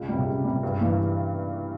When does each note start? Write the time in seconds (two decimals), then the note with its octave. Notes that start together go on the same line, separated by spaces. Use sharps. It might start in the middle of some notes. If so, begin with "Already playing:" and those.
Already playing: C#2
0.08 C3 G3
0.27 C#2
0.44 C3 G3
0.63 G2
0.81 E3 G3 A#3